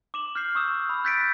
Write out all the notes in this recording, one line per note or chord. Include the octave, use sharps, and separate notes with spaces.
D6 E7 F#7
F6 G6 C7
C#6 D#6 E6 E7
B5 E6
F#6 G6 A6 B6 C#7 D7